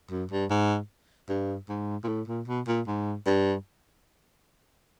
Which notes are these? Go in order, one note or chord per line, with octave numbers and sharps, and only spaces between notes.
F#2
G2
G#2
G2
G#2
A#2
A2
A#2
B2
A#2
G#2
G2